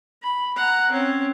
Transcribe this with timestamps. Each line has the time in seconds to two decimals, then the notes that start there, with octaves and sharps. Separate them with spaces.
0.23 B5
0.56 F#5 A#5
0.90 C4 C#4